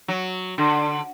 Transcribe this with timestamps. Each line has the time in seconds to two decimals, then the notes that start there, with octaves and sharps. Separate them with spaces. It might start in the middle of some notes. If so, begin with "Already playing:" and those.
0.08 F#3
0.58 D3